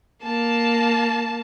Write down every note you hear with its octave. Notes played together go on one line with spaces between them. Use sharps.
A#3 A5